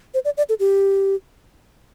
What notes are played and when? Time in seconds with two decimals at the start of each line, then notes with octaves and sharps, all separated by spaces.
0.14 C5
0.25 D5
0.37 D5
0.49 A4
0.60 G4